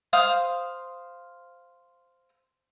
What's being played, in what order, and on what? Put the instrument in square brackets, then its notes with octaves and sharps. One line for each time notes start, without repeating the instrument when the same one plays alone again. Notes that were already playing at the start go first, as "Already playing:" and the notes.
[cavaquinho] C5 F5 D#6